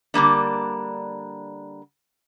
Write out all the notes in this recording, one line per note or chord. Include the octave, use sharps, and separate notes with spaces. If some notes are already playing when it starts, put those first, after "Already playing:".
D3 G3 A#3 D4